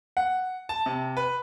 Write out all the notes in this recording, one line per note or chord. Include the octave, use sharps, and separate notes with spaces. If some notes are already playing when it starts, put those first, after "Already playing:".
F#5
A5
C3
B4